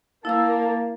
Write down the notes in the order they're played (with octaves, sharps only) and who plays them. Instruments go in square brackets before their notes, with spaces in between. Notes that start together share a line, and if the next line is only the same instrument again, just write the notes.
[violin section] A#3 [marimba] E4 E6 [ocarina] F5 [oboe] A5